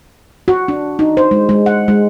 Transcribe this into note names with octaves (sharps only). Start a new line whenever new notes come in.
F#4
D4
D#4
C5
G#3
G#3
F#5
G#3